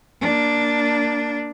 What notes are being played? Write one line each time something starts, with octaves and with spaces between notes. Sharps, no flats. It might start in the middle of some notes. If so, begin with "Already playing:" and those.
A#3 D4